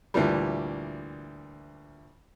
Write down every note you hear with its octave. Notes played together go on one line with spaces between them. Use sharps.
D2 A#2 E3 G3